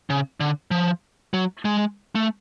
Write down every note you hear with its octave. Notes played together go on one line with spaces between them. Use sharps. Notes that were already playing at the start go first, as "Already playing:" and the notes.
C#3
D3
F3
F#3
G#3
A3